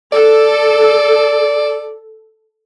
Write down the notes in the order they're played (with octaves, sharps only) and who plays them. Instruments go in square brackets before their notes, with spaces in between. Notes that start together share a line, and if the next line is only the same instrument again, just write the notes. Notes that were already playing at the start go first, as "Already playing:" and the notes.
[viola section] A4 [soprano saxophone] D5